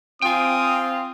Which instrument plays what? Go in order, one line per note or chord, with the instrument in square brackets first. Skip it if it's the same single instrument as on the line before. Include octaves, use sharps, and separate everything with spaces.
[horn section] C4 F4 [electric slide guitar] G5 G#5 [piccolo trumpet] D#6